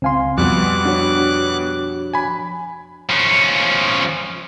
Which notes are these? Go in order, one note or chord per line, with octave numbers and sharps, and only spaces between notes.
C#2 C4 F5 G#5 C6
F2 B2 F3 G3 B3 D6 F#6
D4 F#4 C#5
G#5 B5
F3 C#4